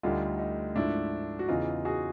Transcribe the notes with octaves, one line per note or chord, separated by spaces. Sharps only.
D2 D3 G3 D#4 F4
D#4
G#2 F3 A3 D4 E4
F#4
E2 C#3 E3 D#4 F4
F#4 G#4